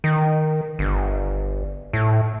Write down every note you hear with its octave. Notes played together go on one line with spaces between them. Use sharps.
D#3
G1
A2